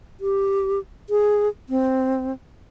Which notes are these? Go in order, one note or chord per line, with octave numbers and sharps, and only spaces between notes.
G4
G#4
C4